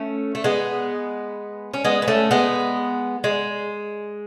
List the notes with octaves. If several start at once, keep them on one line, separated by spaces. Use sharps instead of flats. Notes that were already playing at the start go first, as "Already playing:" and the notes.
Already playing: A3 C#4
A3
G#3 B3
C#4
G#3 B3
B3
A3 C#4
G#3 B3
G#3